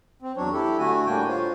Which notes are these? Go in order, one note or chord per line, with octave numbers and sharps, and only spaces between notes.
C4
E2 F#3 D4 C#5
E4 G4 A4
D3 A3 F#4 G#5
A2 G3 A#3 D4 G5 G#5
F4 C5 C#5